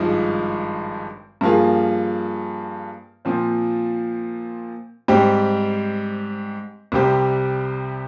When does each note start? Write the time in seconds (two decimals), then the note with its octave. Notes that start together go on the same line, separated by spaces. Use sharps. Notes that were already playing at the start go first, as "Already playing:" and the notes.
Already playing: G#1 G2 F3 G#3 D#4
1.41 G2 F3 A#3 F4 G#4
3.25 A#2 F3 C4
5.08 G#2 G3 C4 G4
6.92 C2 C3 G3 C4 G4